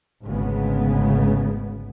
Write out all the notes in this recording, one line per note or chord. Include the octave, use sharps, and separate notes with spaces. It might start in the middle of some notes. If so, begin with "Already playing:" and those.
G#1 D2 C#3 G#3 B3